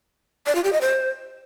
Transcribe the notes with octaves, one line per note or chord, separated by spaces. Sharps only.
D5
F4
G4
D#5
C5